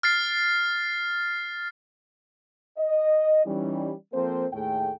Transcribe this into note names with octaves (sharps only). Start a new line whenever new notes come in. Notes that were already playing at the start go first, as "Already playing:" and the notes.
F6 A6 C7
D#5
E3 G3 C#4 D#4
F3 A#3 C4 A4 C5
D#2 A2 A3 G#4 G5